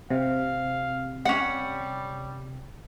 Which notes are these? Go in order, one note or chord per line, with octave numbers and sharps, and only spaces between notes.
C3 F5
G3 C#4 F#5